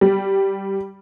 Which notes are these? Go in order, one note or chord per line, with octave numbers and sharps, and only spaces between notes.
G3